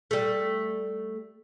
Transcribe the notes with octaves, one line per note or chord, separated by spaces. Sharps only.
G3 A3